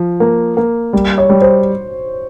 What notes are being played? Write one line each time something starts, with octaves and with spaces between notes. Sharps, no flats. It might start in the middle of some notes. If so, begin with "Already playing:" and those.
Already playing: F3
A#3
A#3
G3
C#5
G3
C5